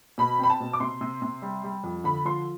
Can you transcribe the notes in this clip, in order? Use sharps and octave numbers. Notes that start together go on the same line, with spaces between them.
B2 B5
C4 B5
A5
B2
D6
C3 C6
C3
C3
G3
G3
F2
D3 B5
F3 C6